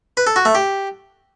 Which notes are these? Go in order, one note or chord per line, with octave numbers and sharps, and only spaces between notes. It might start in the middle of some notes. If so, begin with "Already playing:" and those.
B4
A4
F#4
A3
G4